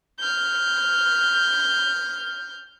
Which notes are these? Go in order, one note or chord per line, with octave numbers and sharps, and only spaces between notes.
F6 G6